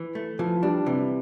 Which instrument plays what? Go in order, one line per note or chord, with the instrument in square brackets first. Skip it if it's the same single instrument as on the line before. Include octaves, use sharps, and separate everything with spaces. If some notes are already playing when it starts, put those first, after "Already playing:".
Already playing: [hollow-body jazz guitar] E3
A3
[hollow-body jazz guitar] E3 [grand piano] F3
[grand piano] G3 [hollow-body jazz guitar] D4
[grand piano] C3 [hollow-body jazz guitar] E3